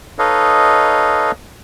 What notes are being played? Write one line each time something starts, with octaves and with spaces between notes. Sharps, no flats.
D#4 A4 B4 C#5 D#5 F5